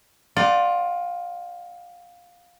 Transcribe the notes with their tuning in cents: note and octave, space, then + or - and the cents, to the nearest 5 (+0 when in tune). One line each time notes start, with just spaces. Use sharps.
F4 +15 D5 +15 G5 -45